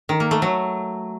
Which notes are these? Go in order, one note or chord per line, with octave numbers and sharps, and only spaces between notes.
D#3
A#3
A3
F#3